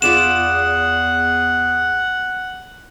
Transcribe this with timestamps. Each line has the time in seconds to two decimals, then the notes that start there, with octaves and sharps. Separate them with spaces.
0.02 E2 F4 G#4 D5 F#5 B5 E7